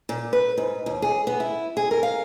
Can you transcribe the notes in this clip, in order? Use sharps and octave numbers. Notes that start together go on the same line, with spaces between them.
A#2
B4
G#2
D#2
G#4
B3
E4
G#4
A#4
F5